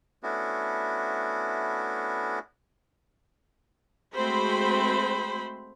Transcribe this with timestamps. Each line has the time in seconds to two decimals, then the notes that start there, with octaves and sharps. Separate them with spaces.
0.23 A3 B3 C#4 D4 E4 F#4
4.15 G#3 A3 C4 F#4 C5 B5